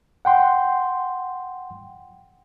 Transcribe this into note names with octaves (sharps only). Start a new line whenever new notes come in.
F#5 G5 C6